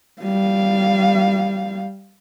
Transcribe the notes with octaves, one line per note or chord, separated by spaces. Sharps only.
G3 F5